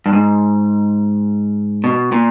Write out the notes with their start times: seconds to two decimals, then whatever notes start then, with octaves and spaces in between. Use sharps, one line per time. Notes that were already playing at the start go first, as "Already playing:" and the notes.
0.06 G2
0.13 G#2
1.84 B2
2.12 A#2